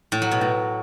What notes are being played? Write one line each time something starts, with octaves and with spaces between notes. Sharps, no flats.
A2
F#3
B2
A2